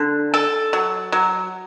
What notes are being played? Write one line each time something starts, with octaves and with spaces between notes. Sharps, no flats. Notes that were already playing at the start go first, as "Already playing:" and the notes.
Already playing: D3
A4
F#3
F#3